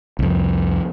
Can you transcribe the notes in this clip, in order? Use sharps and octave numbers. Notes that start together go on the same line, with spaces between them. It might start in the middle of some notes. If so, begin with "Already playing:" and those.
C2 F2